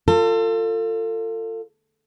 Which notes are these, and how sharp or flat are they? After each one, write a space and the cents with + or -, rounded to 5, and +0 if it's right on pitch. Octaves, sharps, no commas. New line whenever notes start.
F4 +0 A4 +30